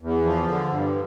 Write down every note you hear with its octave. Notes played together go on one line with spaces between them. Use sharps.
E2
F3
D3
G2